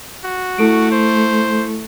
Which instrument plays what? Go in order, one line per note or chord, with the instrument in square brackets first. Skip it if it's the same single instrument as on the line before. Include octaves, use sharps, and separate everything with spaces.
[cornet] F#4
[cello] A3 [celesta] E4 A4 D7
[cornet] C5